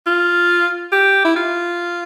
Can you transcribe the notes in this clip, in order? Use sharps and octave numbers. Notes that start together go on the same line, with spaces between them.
F4
G4
E4
F4